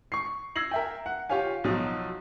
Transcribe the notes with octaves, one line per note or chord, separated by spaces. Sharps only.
C#6 C7
E6 G#6 A#6 C7 F#7
A#4 E5 G5
F#5
F4 G4 C#5 F5 G#5
B1 F3 F#3 D#4